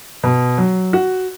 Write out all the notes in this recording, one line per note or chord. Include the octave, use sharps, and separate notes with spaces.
B2
F#3
F#4